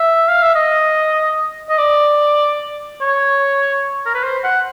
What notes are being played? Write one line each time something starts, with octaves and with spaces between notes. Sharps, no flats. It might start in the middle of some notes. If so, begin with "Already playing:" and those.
Already playing: E5
F5
E5
D#5
D#5
D5
C#5
A#4
B4
C5
F#5